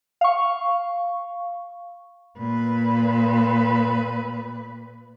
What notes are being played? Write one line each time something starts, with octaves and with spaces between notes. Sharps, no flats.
F5 C#6
A#2 B4